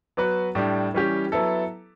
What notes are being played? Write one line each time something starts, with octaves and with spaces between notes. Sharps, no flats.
F#3 B3 F#4 B4
A2 G3 D4
E3 G3 C#4 G4
F#3 B3 E4 A4